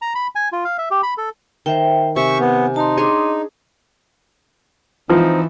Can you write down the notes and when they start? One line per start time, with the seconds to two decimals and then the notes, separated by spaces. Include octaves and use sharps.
0.02 A#5
0.15 B5
0.35 G#5
0.52 F4
0.65 F5
0.78 E5
0.91 G4
1.03 B5
1.18 A4
1.66 D#3 C5 E5 G5
2.16 C3 E5 G#5 C#6
2.40 B3
2.76 D#4 A5 C6
2.97 D4 G#4 C#5 D#5 C6 D6
5.09 E3 F3 C4 D#4